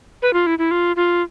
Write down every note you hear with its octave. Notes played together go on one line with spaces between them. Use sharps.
B4
F4
E4
E4
F4
F4